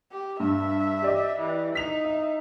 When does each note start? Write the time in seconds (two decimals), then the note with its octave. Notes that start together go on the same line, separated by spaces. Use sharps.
0.12 G4
0.40 G2 E5
1.02 G4 D5 D#5
1.40 E3
1.75 D#4 B6 F7
2.05 E5